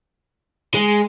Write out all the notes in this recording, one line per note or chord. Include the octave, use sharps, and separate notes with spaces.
G#3